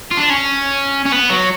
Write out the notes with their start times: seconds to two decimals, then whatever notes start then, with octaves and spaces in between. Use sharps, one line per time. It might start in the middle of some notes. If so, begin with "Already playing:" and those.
0.11 F4
0.17 D4
0.30 C#4
1.05 C#4
1.12 B3
1.29 F#3